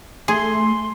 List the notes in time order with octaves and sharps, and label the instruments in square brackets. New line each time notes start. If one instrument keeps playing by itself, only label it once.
[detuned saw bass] A3 [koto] G#4 [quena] C6